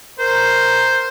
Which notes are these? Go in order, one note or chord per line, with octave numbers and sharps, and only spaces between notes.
A#4 C5